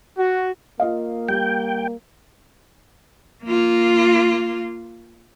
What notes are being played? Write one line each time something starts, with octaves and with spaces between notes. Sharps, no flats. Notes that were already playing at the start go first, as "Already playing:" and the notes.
F#4
A#3 F4 D#5 F5
G3 G5
A#3 F4